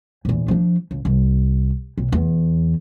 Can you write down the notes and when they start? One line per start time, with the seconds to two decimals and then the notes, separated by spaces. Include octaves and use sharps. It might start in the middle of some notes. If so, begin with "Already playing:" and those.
0.25 A#1 E2
0.48 F3 D4
0.91 C#2
1.05 C2
1.98 B1
2.12 E2